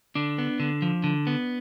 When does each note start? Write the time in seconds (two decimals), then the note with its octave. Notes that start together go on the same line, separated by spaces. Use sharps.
0.15 D3 D4
0.38 B3
0.60 D3
0.82 F3
1.04 D3
1.27 B3